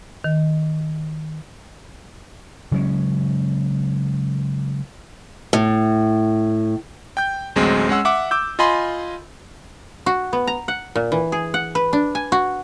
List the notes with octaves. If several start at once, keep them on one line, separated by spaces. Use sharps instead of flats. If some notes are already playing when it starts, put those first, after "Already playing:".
D#3
C#3 F#3 G#3 C#4
A2
G5 G6
A1 D2 F#3 G#3 C4
G#3 C#4 F#5 E6
E5 F#5 D6
D6 E6 G6
F4 D#5 G#5 B5 C6
F#4
B3
A#5
F#5
A#2
E3
G#4
F#5
B4
D4
G#5
F#4